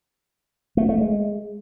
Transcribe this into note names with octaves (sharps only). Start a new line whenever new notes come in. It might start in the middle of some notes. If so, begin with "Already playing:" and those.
A3
A3
G#3